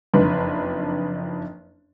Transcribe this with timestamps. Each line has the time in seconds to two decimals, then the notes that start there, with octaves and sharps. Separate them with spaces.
0.14 F#1 F2 D4 D#4 B4